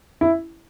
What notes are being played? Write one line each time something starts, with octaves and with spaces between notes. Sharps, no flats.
E4